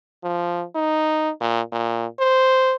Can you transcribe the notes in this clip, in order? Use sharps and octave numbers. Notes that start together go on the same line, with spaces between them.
F3
D#4
A#2
A#2
C5